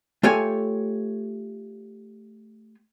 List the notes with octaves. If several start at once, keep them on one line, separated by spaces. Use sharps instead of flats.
A3 F4 G4 A4 C#5 G#5